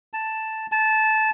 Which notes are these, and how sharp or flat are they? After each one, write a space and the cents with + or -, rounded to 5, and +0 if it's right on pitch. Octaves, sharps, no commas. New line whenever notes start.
A5 +0
A5 -15